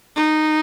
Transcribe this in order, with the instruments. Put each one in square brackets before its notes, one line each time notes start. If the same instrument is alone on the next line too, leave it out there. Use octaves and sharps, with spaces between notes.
[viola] D#4